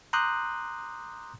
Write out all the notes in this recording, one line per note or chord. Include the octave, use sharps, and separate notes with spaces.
A#5 C6 D6 D#6 F#6 G6